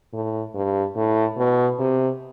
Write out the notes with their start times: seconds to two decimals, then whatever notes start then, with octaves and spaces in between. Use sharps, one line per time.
0.13 A2
0.55 G2
0.96 A2
1.38 B2
1.79 C3